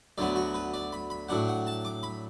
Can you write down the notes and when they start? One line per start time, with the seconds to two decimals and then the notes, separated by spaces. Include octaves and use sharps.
0.18 D2 D3 F#3 B3 D5
0.36 F#4
0.54 B4
0.74 D5
0.93 B5
1.10 B5
1.29 A2 F#3 D4 F#5
1.48 F#5
1.67 A5
1.85 D6
2.03 B5